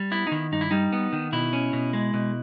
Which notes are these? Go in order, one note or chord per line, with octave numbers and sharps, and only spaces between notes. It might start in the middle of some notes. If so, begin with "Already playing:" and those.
Already playing: G3
B3 E4
D#4
D#3 E4
G2 D#4
E4
G3 D#4
B3
D#3
B2 E4
C#4
B2
G#3
B2